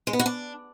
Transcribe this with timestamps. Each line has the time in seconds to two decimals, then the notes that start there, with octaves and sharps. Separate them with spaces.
0.07 G#3
0.13 B3
0.19 F#4
0.26 D4